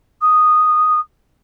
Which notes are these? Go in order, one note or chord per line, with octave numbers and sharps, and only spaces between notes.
D#6